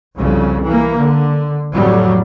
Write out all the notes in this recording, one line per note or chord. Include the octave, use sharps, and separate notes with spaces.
C2 F2 C#3
E3 A#3
D3
F2 A2 F#3 G3